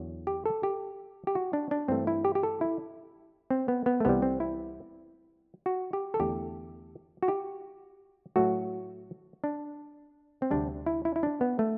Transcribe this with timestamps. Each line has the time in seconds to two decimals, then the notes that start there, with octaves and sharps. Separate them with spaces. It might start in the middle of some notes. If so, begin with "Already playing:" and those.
Already playing: E2 D3 F#3
0.27 G4
0.46 A4
0.63 G4
1.27 G4
1.35 F#4
1.53 D4
1.71 D4
1.88 G2 E3 A3 C4
2.07 E4
2.25 G4
2.35 G4
2.43 A4
2.61 E4
3.50 C4
3.68 B3
3.86 B3
4.00 A3
4.05 C2 C3 E3 G3 B3
4.22 C4
4.40 E4
5.66 F#4
5.93 G4
6.14 A4
6.20 E2 D3 A3 G4
7.23 F#4
7.28 G4
8.36 A2 F#3 A3 F#4
9.44 D4
10.42 C4
10.51 D2 C3 G3 D4
10.86 E4
11.05 E4
11.16 E4
11.23 D4
11.41 B3
11.59 A3